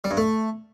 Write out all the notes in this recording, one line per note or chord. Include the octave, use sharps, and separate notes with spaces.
G3
G2
A3